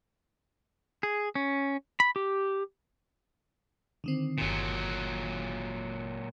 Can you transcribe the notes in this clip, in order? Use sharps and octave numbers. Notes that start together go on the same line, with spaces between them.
G#4
C#4
B5
G4
D3 D#3 C4
G1 A#2 D#3 F#3